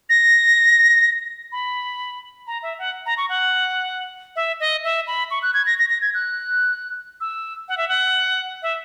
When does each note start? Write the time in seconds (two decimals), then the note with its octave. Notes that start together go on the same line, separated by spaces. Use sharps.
0.10 A#6
1.52 B5
2.47 A#5
2.63 E5
2.79 F#5
3.06 A#5
3.18 C#6
3.29 F#5
4.36 E5
4.60 D#5
4.84 E5
5.07 B5
5.31 C#6
5.42 F#6
5.54 G#6
5.66 A#6
5.79 A#6
5.90 A#6
6.01 G#6
6.14 F#6
7.21 E6
7.68 F#5
7.77 E5
7.89 F#5
8.62 E5